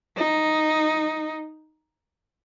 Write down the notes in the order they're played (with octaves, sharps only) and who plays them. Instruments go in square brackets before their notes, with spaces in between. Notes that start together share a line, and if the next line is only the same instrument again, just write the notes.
[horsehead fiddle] D#4